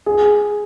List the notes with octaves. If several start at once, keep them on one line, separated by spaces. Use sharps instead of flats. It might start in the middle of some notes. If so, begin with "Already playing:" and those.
G#4